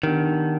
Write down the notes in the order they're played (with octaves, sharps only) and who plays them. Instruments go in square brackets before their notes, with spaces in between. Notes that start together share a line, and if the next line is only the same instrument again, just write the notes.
[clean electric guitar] D#3 [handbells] B3 D4 G4